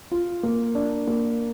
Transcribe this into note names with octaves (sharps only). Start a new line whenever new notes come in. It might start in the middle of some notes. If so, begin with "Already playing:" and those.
F4
A#3
D4
A#3